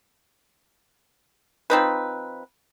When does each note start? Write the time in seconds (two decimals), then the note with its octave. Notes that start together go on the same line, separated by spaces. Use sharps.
1.70 F3 C4 D#4 B4